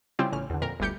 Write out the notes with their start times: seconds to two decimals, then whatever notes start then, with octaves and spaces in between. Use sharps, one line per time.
0.19 C#3 G3 C4 E4 F4 G4
0.32 A1 C#3 F6
0.50 E2 D3
0.62 F2 A#2 A#4
0.80 G1 D2 G3 G4 G6 C#7